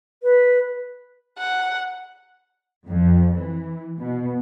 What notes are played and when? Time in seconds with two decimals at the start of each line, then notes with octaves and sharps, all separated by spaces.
0.23 B4
1.38 F#5
2.87 F2
3.36 E3
3.99 B2